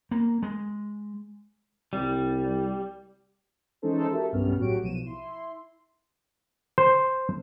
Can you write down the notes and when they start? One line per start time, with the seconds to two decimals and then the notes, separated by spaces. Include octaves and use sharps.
0.11 A#3
0.43 G#3
1.93 C2 G3
3.82 E3 G#3 C#4 D#4 A4 C5
4.11 E4 F#4 G4 A4 A#4 E5
4.32 B1 G2 G3 B3 C#4 F6
4.58 A2 F#3 F#4 G4 C#5 D7
4.81 B1 B2 F3 D#7 E7
5.05 E4 C6
6.78 C5